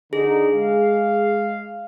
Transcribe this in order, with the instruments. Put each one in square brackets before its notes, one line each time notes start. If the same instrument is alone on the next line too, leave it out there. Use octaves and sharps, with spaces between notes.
[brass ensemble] D3 D#4 [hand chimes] G#4
[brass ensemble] G#3 F5